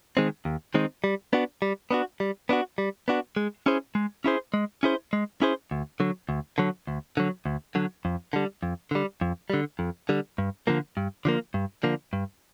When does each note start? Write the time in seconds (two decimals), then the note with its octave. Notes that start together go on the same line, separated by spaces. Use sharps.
0.17 D#3 G#3 C4 D#4
0.45 D#2
0.74 D#3 G#3 C4 D#4
1.04 G3
1.33 B3 D4 F#4
1.62 G3
1.91 B3 D4 F#4
2.20 G3
2.49 B3 D4 F#4
2.78 G3
3.08 B3 D4 F#4
3.36 G#3
3.66 C#4 E4 G#4 C5
3.95 G#3
4.24 C#4 E4 G#4 C5
4.54 G#3
4.83 C#4 E4 G#4 C5
5.13 G#3
5.42 C#4 E4 G#4 C5
5.71 D2
6.00 D3 F#3
6.29 D2
6.58 D3 F#3
6.87 D2
7.17 D3 F#3
7.46 D2
7.75 D3 F#3
8.05 F2
8.33 D3 G3
8.63 F2
8.91 D3 G3
9.21 F2
9.50 D3 G3
9.79 F2
10.09 D3 G3
10.38 G2
10.67 D3 F3 A#3
10.97 G2
11.25 D3 F3 A#3
11.54 G2
11.83 D3 F3 A#3
12.13 G2